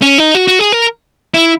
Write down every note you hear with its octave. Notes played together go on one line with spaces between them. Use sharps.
C#4
D#4
F#4
F#4
G#4
A#4
E4